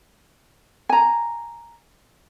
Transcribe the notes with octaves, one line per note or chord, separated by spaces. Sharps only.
G#5 A#5